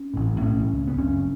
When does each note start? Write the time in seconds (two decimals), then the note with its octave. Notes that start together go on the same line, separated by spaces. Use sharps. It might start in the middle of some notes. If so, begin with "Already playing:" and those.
Already playing: C#4
0.14 A1 A2
0.42 B1 A2 C#4
0.71 C#2 C#3
0.88 B3
0.98 G1 F#2 C#3 C#4